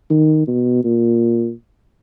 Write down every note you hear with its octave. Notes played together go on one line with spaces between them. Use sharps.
D#3
B2
A#2